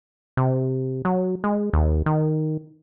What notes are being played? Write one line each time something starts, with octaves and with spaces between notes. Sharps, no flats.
C3
F#3
G#3
D#2
D#3